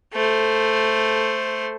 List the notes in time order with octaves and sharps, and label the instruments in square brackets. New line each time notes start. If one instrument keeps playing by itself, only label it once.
[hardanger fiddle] A3 C5